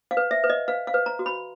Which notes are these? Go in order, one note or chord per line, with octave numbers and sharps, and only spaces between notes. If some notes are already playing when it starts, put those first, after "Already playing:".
F5
B4
E5
B4
D#5
B4 F5
F5
B4
A#5
F#4
B5